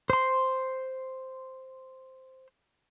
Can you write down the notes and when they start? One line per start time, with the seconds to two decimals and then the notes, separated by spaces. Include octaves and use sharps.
0.10 C5 C6